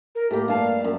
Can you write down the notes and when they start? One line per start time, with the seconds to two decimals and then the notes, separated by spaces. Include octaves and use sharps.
0.15 A#4
0.31 A2 A#3 G4
0.48 G2 F5 A5
0.80 F#2 F5